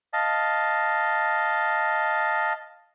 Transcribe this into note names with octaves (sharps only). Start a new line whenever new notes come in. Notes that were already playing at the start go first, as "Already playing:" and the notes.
D#5 F5 A5